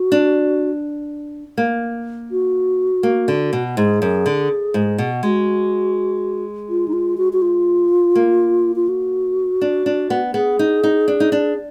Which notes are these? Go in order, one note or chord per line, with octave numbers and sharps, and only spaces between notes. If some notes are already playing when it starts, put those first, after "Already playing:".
Already playing: F#4
D4
A#3
F#4
A#3
D3
B2
G#2 G#4
F#2
D3
G#2
B2
G#3 F#4
F4
D#4
F4
F#4
F#4
F4
A#3
F4
F#4
D4
D4
B3
B3 G#4
D#4
D#4
D4
D#4
D4